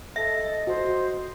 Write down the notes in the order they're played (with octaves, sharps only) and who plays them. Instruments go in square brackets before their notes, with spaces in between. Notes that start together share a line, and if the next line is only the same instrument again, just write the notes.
[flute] A4 [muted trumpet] D#5 [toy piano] E5
[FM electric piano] F#4 [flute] C5